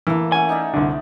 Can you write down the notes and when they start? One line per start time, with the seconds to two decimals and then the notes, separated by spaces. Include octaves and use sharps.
0.07 E3 A3 A#3
0.32 A3 C#4 F#5 G#5
0.49 D#4 D5 E5
0.74 C2 D3